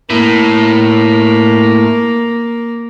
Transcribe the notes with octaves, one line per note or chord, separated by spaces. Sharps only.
A2 A#3